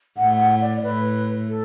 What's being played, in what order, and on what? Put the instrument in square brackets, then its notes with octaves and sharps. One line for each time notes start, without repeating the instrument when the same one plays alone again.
[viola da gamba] A2 [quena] F#5
[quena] F#5
D5
[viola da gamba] A2 [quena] B4
[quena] A4